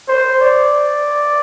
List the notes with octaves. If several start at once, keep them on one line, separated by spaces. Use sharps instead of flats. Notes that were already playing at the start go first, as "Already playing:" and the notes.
C5
D5